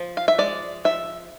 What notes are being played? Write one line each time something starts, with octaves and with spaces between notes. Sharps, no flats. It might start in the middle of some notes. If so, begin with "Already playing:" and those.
Already playing: F3
F5
E5
G#3 D5
F3 E5